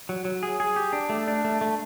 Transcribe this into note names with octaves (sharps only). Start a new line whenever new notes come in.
F#3
F#3
G#4
G#4
G4
D4
A3
D4
A3
A3